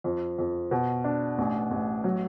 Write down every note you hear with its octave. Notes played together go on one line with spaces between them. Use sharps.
F2
F2
B2
D4
A1
A1
F#3